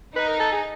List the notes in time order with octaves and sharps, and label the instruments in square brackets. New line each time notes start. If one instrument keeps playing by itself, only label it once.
[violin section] D#4 [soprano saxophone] B4
[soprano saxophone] A#4
A4
G#4